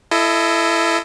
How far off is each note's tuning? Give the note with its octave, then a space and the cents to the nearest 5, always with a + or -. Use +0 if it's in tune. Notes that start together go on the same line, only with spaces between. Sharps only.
E4 +20 A4 +0 D#5 +0